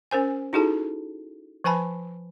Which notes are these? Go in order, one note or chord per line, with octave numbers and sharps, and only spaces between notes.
C#4 A#4 C5 G#5
D#4 E4 F#4 G#4 A4 A5
F3 B4 G#5 A5 B5